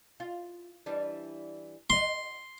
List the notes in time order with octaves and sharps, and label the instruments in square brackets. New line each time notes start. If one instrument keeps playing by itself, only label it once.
[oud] F4
E3 G3 D4
[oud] F#4 D#5 [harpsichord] C6